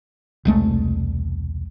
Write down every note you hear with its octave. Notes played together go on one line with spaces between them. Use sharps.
E1 C2 G#3 A3